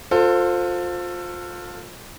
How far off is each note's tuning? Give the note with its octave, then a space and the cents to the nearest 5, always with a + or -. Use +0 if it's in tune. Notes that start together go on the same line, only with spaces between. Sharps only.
F4 +25 A4 +25 C5 +0